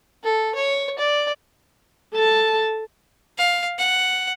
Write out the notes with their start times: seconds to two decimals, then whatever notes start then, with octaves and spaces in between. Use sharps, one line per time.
0.24 A4
0.55 C#5
0.99 D5
2.14 A4 A5
3.38 F5
3.79 F#5